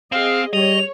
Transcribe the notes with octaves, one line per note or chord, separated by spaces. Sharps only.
C4 G#4 D#5 F5
G3 C#5 D#5 F7